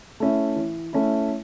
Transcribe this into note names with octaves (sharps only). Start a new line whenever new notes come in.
A3 C#4 E4
E3
A3 C#4 E4